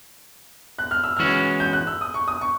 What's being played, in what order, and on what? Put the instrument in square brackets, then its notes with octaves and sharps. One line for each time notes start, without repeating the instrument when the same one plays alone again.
[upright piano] F#6
F6
E6
[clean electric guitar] E3 G#3 C#4 F#4 [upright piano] F6
[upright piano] G6
F#6
E6
D#6
C#6
D#6
C#6